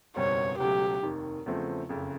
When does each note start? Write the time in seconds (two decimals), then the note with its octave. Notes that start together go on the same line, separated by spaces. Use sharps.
0.16 F#1 E2 B2 G3 C4 C#5
0.59 C#2 B2 F#3 A3 G4
1.03 F1 D#2 D#3
1.46 E2 C#3 F3 A3 C4
1.89 F#1 F2 C#3